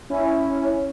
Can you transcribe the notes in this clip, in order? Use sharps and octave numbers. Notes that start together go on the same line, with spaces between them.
C#4 E4